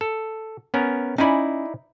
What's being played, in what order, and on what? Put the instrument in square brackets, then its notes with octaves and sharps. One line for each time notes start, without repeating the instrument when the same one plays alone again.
[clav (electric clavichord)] A4
B3 C#4 A#4
[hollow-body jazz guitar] C#4 G#5 B5 [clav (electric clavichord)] D#4 E4 D5